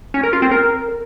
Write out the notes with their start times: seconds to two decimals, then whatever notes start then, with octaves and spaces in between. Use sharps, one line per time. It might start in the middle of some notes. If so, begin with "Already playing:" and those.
0.14 C#4
0.23 A#4
0.33 F4
0.42 C4
0.51 A#4